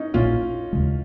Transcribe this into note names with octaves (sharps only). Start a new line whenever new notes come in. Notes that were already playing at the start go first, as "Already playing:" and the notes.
Already playing: C#4 D#4
A#1 A#2 A#3 C#4 F4
D#2 C#3 G#3